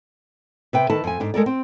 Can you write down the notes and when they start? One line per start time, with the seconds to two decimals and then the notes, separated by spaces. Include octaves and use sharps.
0.73 C3 B4 G5
0.90 D#3 A4 B4 A5
1.04 F2 G#5
1.20 G#2 D4
1.34 G#3 A4 A#4 D5
1.46 C4